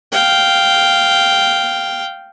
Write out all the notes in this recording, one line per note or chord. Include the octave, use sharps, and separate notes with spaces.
F5 G5